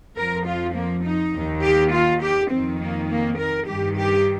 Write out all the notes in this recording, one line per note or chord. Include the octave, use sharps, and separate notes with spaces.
F2 F3 A#4
F4
A#3
D#4
D#2 D#3
G4
F4
G4
F2 D#3 C4
A#3
A#3
A#4
G2 D#3 G4
G4